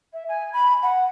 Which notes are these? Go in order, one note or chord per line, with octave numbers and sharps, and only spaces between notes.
E5
G#5
B5
F#5